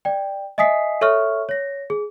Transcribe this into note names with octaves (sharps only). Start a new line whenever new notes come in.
D5 G5
D#5 E5 G#5 D#6 B6 C7
A4 C#5 E5 C#6 F6
C#5 A#6
G#4